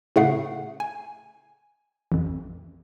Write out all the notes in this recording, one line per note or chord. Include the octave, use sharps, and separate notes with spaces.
A2 C#3 A3 F#5 C7
G#5
A1 F2